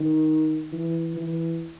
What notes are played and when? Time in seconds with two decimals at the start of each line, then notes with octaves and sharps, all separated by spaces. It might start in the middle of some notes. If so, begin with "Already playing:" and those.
Already playing: D#3
0.72 E3
1.16 E3